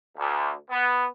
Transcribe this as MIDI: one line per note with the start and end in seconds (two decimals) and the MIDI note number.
0.18 0.52 38
0.70 1.06 59